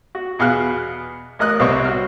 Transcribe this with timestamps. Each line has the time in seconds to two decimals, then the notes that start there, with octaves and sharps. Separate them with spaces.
0.15 F#4
0.39 E2 B2 G#4 F5 F6 F#6
1.39 A1 A#3 A#4 D#5 D#6 F#6
1.60 C2 C3 C4 C#5 D#5 C#6
1.85 F#4 F6